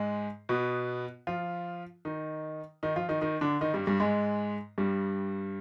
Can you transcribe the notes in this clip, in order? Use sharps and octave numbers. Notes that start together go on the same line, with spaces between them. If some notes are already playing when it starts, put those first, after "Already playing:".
Already playing: G#2 G#3
B2 B3
F3 F4
D#3 D#4
D#3 D#4
F3 F4
D#3 D#4
D#3 D#4
D3 D4
D#3 D#4
G2 G3
G2 G3
G#2 G#3
G2 G3